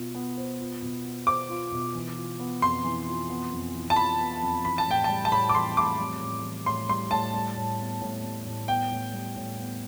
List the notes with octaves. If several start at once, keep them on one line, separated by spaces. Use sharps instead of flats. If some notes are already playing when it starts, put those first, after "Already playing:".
Already playing: B2 B3 F4
B3
C5
F4
B2
B3
C5 D6
F4
B2
E3
F4
B3
F2 C6
E3
F4
B3
F2
E3
A5
F4 B5
B3
F2
E3 B5
A5
A2 G5
G3 A5
A5
A2 B5
D6
E3 C6
A2 D6
G3
A2
E3
A2 C6
G3 C6
A2 A5
G3
A2
B3
A2
G3
A2
B3 G5
A2
G3
A2
B3